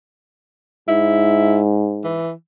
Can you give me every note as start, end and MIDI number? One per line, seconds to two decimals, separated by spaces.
0.88 2.28 44
0.88 1.61 64
2.04 2.31 52